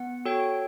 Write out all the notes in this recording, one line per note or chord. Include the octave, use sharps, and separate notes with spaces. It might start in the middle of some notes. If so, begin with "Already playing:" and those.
Already playing: B3 F#5
F#4 A4 C#5 G5